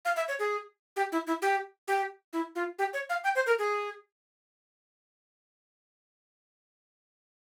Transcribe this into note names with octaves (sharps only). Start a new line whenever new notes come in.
F5
E5
C#5
G#4
G4
E4
E4
G4
G4
E4
F4
G4
C#5
F5
G5
C5
A#4
G#4